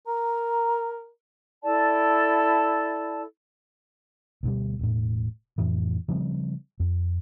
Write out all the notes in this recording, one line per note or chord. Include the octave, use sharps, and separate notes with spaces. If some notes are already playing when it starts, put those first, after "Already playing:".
A#4 A#5
E4 A4 D5 A5
D2 B2 G3
E1 A2
F2 A2 E3
C#3 F3 G3 C4
F2